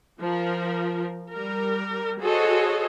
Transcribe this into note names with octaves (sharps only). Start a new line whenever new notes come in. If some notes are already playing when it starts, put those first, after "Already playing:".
F3 A#4
G3 A#4
F#4 G#4 A4 C5 C#5 D#5